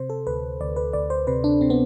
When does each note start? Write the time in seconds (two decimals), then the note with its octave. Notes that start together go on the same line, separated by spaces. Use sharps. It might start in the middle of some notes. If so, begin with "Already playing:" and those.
Already playing: C3 C5
0.10 A4
0.27 D2 B4
0.61 D2 D5
0.76 B4
0.93 D2 D5
1.10 C5
1.27 C3 B4
1.44 D4
1.61 C3 C4
1.70 B3